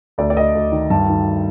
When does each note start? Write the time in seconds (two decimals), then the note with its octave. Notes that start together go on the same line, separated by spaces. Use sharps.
0.18 D2 D5
0.30 D5
0.36 D2 D#5
0.55 D2
0.72 D#3
0.90 G2 A5
1.09 D#3